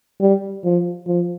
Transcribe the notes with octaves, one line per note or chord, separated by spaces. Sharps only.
G3
F3
F3